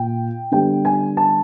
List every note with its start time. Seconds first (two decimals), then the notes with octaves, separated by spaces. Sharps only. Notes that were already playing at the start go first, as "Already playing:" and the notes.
Already playing: A#2 G5
0.51 D3 G3 B3 G5
0.85 G#5
1.17 A5